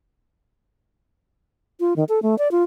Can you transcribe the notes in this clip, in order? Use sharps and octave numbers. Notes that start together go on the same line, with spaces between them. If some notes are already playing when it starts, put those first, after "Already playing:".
F4
D#3
A4
A3
D5
F4